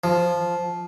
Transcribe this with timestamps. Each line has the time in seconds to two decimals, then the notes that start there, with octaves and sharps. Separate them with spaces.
0.04 F3